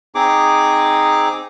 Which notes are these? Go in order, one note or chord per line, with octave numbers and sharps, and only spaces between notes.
C4 D#4 G#4 D6